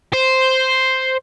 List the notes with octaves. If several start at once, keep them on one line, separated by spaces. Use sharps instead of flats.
C5